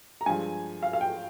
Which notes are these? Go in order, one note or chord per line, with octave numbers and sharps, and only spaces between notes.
A#5
G2 F3 G#3 G#5
F5
F5
G5